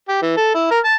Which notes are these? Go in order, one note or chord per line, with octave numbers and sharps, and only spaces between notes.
G4
E3
A4
E4
A#4
A5